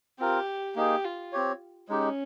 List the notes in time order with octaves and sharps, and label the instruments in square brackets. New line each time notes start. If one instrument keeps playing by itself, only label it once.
[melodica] C4 F4 A#4 [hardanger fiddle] G4
[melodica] A#3 D#4 G#4 [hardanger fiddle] G4
[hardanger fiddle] F4
[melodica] C4 G4 C#5
[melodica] G#3 D#4 G4 [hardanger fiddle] C#4